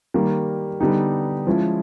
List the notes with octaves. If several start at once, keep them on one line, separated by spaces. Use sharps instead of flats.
D#3 G3 A#3
D3 G3 B3 D#4 G4
F3 G#3 C#4 E4